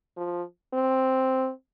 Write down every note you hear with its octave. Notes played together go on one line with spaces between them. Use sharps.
F3
C4